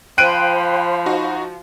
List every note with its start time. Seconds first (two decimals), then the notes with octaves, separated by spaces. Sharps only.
0.18 F3 C5 F5 G5 B5 F#6 D7 D#7
1.06 D#4 F#4